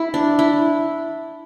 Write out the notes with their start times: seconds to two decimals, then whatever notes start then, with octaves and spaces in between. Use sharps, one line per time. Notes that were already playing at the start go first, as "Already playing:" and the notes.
Already playing: E4
0.14 D4
0.39 E4